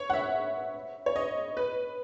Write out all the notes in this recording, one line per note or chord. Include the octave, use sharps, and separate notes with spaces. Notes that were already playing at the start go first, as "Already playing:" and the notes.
Already playing: C#5
F#5
E5
C#5
D#5
B4